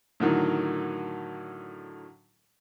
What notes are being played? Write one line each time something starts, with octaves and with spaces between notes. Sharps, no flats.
A2 D3 D#3 F#3